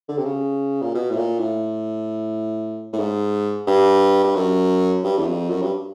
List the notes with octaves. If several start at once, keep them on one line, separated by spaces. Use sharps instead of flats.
D3
C3
C#3
A#2
B2
A2
A#2
A2
A2
G#2
G2
G2
F#2
G2
E2
F2
F#2
G2